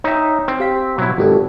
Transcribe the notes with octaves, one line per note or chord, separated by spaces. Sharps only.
D#4 C#5 E5 G5
C4
G4 F5 B6
B2 F#3 E4
G#1 F4 G4 A4